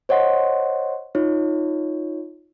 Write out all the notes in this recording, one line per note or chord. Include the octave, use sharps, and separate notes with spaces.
C5 C#5 D#5 F#5 C6
D#4 F4 C#5